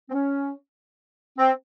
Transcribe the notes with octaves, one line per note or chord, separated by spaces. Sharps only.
C4
C#4
C4